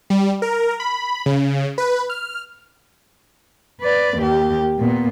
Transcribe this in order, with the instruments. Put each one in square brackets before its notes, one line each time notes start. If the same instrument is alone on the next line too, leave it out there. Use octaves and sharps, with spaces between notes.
[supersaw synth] G3
A#4
B5
C#3
B4
F6
[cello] B4 D5
D#2 G4
A#2 B3